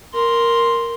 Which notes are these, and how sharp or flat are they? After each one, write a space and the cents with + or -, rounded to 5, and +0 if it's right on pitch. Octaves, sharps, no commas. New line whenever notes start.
A#4 +0 C6 +0